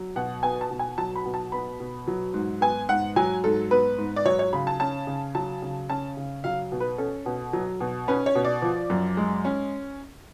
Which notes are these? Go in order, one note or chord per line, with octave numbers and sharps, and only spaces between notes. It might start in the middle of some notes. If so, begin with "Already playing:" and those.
Already playing: F#3
B2 F#5
B3 G#5
A5
B2
G#5
F#3 A5
B5
B2
A5
B3 B5
B2
F#3
G#2
B3 G#5
G#2 F#5
F#3 G#5
G#2 A4
B3 B4
G#2
D5
F#3 C#5
C#5
C#3 B5
A5
C#4 A5
C#3
F#3 A5
C#3
C#4 A5
C#3
F#3 F5
B2
B4
C#4 A4
B2
F#3
B2
C#4 B4
C#5
B2
D5
F3
F#2
G#3
C#4